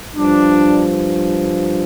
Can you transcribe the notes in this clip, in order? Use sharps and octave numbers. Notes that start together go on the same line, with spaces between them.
G2 F3 D4